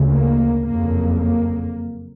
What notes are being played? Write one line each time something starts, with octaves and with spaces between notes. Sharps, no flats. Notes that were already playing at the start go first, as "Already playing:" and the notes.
Already playing: D2 C#3
A#3
F#1 F2 C#3 A#3
A#3